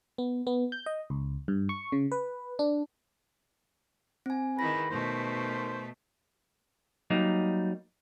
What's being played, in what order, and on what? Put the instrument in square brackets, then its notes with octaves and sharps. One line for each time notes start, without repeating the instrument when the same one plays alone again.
[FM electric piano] B3
B3
G6
D#5
C#2
G2
C#6
C#3
B4
D4
[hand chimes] C4 G#5
[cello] D#3 E4 [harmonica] G#3 B4 B5 [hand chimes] A#6
[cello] B2 A3 [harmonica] D#3 C5
[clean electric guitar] F#3 G3 A#3 D#4